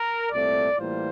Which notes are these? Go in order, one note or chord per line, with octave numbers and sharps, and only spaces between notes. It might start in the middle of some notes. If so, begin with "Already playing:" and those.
Already playing: A#4
C2 A#2 A3 C4 D5
A2 E3 G3 A#3 F4 C5